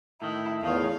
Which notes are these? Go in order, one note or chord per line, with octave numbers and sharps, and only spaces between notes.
A2 D#3 E4
E2 A2 D#3 F4 C#5 F5